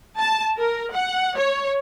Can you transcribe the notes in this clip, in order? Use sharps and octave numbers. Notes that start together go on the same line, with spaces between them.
A5
A#4
F#5
C#5